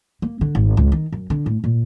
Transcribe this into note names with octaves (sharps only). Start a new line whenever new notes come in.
A#3
D3
G#1
C#2
D#3
F#2
D3
A2
A#2